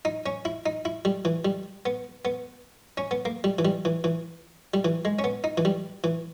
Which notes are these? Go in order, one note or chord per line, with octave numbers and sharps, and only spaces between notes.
D#4
C#4
E4
D#4
E4
G3
E3
G3
B3
B3
C#4
B3
A#3
G3
E3
G3
E3
E3
G3
E3
G#3
C#4
B3
D#4
E3
G3
E3